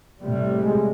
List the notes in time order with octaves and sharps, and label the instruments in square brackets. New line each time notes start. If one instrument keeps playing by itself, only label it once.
[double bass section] A2 C3 G3
[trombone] G#3